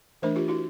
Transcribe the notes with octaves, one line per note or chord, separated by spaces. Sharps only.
E3 A3 D4 A#4 C5
F4 G4
E4 F#4